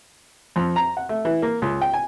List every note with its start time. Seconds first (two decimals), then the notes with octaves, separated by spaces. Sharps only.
0.56 F2
0.76 A#5
0.97 F#5
1.09 A3
1.25 E3
1.42 A#3
1.62 C#2
1.81 G5
1.94 G#5